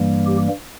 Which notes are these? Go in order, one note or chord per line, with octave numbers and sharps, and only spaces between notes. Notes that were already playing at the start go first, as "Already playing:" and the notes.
Already playing: G2 E3 G3 A#3
G4